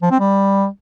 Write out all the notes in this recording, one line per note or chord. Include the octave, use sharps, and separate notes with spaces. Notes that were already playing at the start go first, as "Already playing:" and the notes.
F3
C4
G3